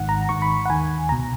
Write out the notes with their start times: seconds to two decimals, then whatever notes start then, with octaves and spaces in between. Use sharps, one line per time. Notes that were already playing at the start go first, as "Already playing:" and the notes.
Already playing: G#1 G#2 D#3 F#5
0.09 A#5
0.29 G#1 G#2 D#3 C#6
0.42 B5
0.65 F#5
0.69 D#2 D#3 G#5
1.09 C#2 B2 A#5